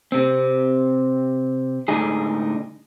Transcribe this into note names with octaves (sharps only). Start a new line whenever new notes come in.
C3 C4
A2 D3 G#3 D4 D#4 G#4